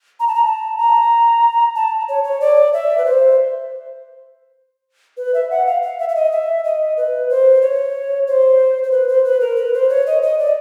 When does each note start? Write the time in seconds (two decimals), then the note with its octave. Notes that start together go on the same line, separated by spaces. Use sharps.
0.20 A#5
0.27 A5
0.35 A#5
0.45 A5
0.78 A#5
1.75 A5
2.09 C#5
2.24 C#5
2.41 D5
2.73 E5
2.98 B4
3.05 C5
5.17 B4
5.34 E5
5.50 F#5
5.66 F5
5.82 F5
5.99 E5
6.09 E5
6.15 D#5
6.32 E5
6.64 D#5
6.97 B4
7.30 C5
7.62 C#5
8.27 C5
8.83 C5
8.91 B4
9.08 C5
9.25 B4
9.40 A#4
9.56 B4
9.74 C5
9.89 C#5
10.06 D#5
10.22 D#5
10.39 D5